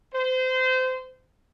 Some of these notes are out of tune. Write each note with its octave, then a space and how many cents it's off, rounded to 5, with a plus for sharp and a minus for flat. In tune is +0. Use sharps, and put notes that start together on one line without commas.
C5 -25